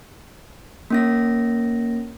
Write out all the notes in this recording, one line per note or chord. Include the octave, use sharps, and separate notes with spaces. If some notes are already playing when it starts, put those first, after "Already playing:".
A#3 C#4 A#6